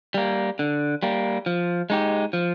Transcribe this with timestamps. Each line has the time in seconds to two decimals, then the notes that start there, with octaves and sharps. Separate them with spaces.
0.14 G3 A#3
0.59 D3
1.03 G3 A#3
1.46 F3
1.90 G#3 D#4 G4
2.33 F3